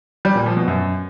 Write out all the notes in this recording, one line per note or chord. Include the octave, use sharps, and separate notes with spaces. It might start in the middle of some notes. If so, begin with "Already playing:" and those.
G3
A#2
F3
B2
F#2